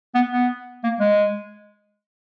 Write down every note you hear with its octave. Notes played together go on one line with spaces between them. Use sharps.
B3
B3
A#3
G#3